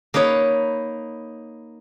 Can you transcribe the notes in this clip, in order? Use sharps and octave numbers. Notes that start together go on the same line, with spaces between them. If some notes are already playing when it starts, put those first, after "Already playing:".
A#3 D#4 B4 C#5